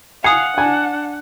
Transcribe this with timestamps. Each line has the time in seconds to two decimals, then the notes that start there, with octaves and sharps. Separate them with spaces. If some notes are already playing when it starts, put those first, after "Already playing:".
0.24 F5 F#5 G#5 D#6 C7 C#7
0.58 D4 G#5